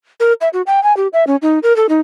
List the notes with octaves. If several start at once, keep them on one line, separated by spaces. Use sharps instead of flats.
A#4
E5
F#4
G5
G#5
G4
E5
C#4
D#4
A#4
A4
D#4